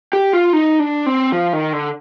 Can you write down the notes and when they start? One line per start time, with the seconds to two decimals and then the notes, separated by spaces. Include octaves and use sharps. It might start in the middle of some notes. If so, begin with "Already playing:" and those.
0.13 G4
0.33 F4
0.53 D#4
0.80 D4
1.06 C4
1.32 F3
1.53 D#3
1.73 D3